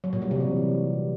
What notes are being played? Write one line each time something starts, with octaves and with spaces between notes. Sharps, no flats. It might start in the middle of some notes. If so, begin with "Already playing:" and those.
F#3
A#2
G3
C3
E3